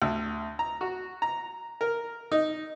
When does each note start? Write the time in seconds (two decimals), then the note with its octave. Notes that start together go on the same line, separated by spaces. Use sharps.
0.02 D2
0.59 A#5
0.81 F#4
1.22 A#5
1.81 A#4
2.32 D#4